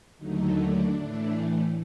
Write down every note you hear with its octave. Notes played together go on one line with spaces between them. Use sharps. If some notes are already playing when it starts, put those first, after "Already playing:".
D#2 D3 F#3 A3 D#4
D4
A2 E3 A3 D4